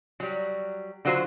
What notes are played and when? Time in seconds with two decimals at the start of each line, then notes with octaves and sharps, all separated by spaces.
0.20 F#3 G3
1.05 D3 F#3 F4 F#4 C5